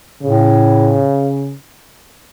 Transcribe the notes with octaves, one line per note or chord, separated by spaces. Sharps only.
A2 C#3